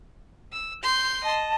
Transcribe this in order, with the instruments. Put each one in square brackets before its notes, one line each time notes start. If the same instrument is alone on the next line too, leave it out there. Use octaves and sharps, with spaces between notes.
[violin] E6
[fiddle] C6 [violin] G6
[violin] D#5 [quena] A5